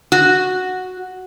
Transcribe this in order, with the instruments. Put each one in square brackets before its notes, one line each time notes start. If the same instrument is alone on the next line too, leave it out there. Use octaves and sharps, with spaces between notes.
[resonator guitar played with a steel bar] F#4